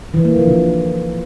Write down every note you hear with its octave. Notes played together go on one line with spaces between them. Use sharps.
E3
A#3
F3
D3